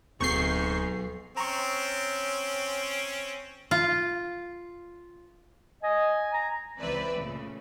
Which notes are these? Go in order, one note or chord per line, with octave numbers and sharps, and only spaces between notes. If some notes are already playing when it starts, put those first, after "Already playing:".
D1 B1 G#2 A#3 C4 C#6 G6 C7
C4 C#4 A#5 C#6
F4
D#5 G#5
A#5
C#2 E3 C4 B4 D5 E5
A#2 C#3 A3